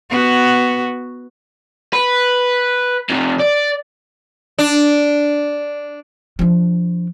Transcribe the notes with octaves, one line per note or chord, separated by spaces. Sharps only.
B3 F#4
B4
C3 F3
D5
D4
F3 D4